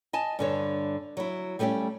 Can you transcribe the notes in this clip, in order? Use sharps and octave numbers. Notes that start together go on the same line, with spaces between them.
D#5 G#5 A5
G2 D3 C#5
F#3 E4
G3 A3 C#4 F#4 G4